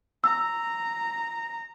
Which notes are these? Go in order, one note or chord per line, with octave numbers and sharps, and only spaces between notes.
A#5 E6